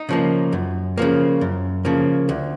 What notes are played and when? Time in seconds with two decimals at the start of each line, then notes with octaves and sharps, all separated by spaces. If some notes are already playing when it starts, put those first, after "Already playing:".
Already playing: D#4
0.09 C#3 F3 A#3
0.52 F#2
0.98 C#3 F3 A#3
1.41 F#2
1.85 C#3 F3 A#3
2.29 D2